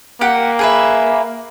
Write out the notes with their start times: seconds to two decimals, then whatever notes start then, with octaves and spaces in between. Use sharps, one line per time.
0.21 A#3 G4 F#5
0.59 G#4 B4 E5